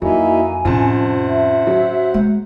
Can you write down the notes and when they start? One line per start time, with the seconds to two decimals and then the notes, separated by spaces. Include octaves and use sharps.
0.02 F2 F#3 A#3 D#4 E4 G#5
0.65 F2 A2 C3 C#4 C5 F#5 A5
1.27 E5
1.67 F#3
2.14 G#3